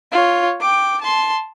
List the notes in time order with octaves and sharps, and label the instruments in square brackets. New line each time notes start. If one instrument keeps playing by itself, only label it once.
[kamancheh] F4 C#5
G5 D6
A5 C6